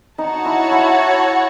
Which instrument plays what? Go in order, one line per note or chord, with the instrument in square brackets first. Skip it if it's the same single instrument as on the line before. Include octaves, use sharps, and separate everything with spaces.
[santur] D#4 [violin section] F#4 C#5 F#5 A5
[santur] E4
E4